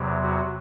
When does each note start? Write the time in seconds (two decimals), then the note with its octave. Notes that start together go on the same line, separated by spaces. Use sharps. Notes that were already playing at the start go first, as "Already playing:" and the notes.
Already playing: E2 C3 F#3
0.22 F#4